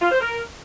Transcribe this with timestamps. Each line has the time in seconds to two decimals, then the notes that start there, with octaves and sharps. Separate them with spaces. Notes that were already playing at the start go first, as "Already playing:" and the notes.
0.02 F4
0.11 C5
0.21 A#4